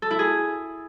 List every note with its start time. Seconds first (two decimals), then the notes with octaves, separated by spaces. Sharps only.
0.02 A4
0.11 E4
0.19 G#4